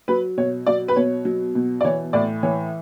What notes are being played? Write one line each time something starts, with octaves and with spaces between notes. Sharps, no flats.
F#3 B4
B2 C#5
F#3 D5
B4
B2 C#5
F#3
B2
D5
E3 C#5
A2 D5
E3 C#5